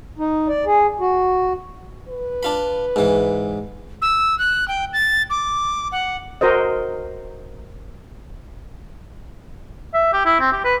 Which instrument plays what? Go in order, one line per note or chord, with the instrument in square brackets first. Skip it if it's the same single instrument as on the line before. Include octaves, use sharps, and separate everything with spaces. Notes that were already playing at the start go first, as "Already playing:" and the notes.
[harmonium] D#4
D5
G#4
F#4
[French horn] B4
[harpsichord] D4 F4 B5
G#2 E3
[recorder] E6
F#6
G5
A6
D6
F#5
[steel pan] F#4 A#4 C5 D#5
[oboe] E5
G4
E4
C4
G4
B4